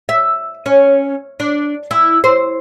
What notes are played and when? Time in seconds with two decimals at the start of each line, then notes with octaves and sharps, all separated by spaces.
0.09 E5
0.66 C#4
1.40 D4
1.91 E4
2.24 C5